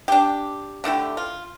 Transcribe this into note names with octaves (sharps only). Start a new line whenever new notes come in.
D4 G4
D3 A3 E4 G4
F4